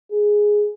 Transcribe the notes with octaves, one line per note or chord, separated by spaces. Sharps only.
G#4